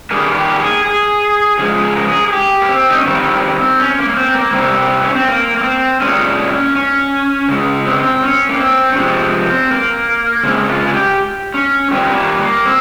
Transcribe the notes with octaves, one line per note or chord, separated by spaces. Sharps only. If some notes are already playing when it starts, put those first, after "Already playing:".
D#3 G3 A#3 G#4
G4
G#4
G#4
C#3 F3 G#3 G#4
G#4
A#4
G#4
G#4
G4
A#3
C4
D#4
C#4
D#3 G3 A#3 C4
C#4
A#3
A#3
C4
A#3
C3 G3 A#3 C4
C#4
C4
A#3
A#3
C4
A#2 G#3 C#4
C#4
C#3 G#3
C4
C#4
A#3
C4
C#4
C3 F3 G#3 C4
A#3
C#3 G#3 C4
F4
G#4
G4
C#4
A#2 G3 A#3 C4
A#3
A#3
C4